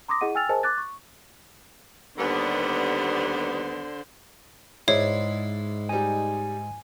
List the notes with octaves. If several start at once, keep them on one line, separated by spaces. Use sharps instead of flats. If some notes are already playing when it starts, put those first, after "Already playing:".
A#5 C6 D6 D#6 A#6
E4 G#4 D#5 F#5 D#7
G5 G#5 E6 F6 A6 F7
G#4 A#4 C5 D#5 G#5 A5
D6 F#6 A6
C#6
D#2 D3 G3 B3 C5
G#2 E4 C#5 D5 E5 C7
G3 D#4 G#5